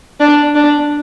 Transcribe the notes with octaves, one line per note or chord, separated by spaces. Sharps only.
D4
D4